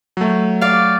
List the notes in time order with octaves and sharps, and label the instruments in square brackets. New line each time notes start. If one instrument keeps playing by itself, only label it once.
[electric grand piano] F#3 A3
[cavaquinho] D5 F5